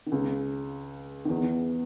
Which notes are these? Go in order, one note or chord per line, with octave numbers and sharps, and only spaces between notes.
D#3
C#2 C#3
D#3
E2 E3